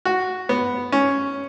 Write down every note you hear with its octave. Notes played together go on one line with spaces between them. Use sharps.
F#4
B3
C#4